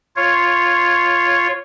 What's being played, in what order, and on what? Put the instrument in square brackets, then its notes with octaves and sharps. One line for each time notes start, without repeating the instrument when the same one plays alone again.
[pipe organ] F4 C#5